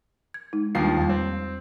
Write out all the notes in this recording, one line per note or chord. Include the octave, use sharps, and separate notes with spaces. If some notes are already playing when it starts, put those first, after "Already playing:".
G#6
G#3 D#4
D#2 F3 G3 D4 C7
E2 G3
C4